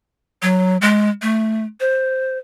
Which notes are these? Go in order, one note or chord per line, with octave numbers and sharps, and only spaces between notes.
F#3
G#3
A3
C5